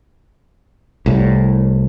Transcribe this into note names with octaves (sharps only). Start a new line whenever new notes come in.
C2 A2